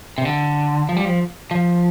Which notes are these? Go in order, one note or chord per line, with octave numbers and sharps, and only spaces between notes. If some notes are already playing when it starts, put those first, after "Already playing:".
C3
D3
F3
G3
F3
F3